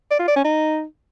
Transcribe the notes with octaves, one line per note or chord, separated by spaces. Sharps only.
D5
F4
D5
C#4
D#4